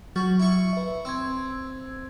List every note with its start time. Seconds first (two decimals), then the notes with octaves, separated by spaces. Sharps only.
0.16 F#3 F#4
0.40 E4 C#6
0.73 B4 E5
1.05 C4 E6 G#6